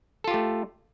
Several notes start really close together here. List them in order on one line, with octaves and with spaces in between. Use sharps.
A4 F4 G4 A3